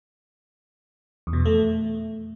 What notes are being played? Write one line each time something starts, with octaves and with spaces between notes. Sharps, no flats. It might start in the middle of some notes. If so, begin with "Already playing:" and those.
E2
B2
F2
A3